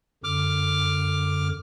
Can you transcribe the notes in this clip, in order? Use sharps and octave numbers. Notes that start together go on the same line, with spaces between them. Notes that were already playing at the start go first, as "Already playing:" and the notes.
F#2 D3 D6 F6